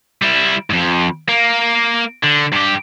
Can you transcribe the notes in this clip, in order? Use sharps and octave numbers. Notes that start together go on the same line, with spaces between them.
G3 E4
F2 G#2
A#3
D3
G2 G4